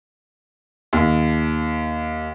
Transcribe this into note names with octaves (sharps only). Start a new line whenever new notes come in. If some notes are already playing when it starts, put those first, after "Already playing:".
D#2